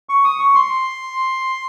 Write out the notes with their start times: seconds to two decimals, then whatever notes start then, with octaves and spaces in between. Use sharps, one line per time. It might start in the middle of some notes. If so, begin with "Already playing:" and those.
0.09 C#6
0.24 D#6
0.39 C#6
0.55 C6